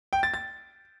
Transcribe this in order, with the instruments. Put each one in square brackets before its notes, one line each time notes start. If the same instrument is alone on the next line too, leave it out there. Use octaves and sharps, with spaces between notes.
[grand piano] G5
A6
A6